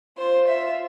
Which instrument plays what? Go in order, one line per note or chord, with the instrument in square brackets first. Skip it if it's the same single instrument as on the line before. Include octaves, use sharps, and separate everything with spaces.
[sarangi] F4 [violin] C5
[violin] E5